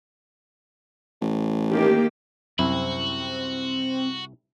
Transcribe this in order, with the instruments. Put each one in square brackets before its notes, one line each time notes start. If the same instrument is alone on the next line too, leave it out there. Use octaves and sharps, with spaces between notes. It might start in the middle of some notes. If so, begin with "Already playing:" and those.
[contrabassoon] A1
[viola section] D#3 A#3 G4
[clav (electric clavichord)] C2 E4 [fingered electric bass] F#2 [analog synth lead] C4 [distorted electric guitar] F#4